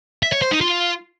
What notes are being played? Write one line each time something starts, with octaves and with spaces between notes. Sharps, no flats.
E5
C#5
C5
D#4
F4